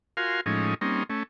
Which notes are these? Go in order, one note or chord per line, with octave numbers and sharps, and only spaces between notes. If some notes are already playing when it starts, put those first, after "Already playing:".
F4 F#4 A#4 F5 G#5 C6
A2 F3 G#3 C#4 D#4
G3 A#3 C4 C#4 D#4
A3 C#4